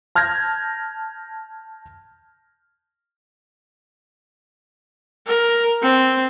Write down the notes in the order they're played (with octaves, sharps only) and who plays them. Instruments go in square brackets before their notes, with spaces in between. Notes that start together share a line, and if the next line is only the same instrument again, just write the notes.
[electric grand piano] A5 F6 G6 G#6 A#6
[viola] A#4
C4